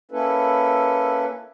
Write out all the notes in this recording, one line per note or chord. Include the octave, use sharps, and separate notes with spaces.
A#3 C#4 E4 A4 B4